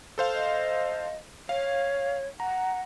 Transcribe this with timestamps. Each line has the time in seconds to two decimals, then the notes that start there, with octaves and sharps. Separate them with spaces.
0.18 A4 C5 F5
0.34 D#5
1.49 C#5 F5
2.40 F#5 A#5